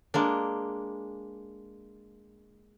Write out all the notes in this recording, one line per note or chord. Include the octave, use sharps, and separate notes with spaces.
G#3 A#3 D4